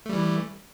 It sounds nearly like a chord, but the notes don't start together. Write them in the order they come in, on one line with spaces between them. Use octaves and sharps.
A3 G3 E3